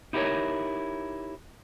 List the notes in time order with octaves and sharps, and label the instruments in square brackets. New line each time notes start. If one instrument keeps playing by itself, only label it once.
[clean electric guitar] D#4 E4 G4 A4 A#4 C#5